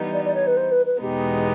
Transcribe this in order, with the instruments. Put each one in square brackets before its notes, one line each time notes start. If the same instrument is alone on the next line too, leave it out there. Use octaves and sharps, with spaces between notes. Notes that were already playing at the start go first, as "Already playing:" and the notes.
Already playing: [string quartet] E3 G3 B3 D#4
[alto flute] D5
D5
C#5
B4
C5
B4
B4
[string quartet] E2 B2 G#3 B3 D#4 [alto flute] G4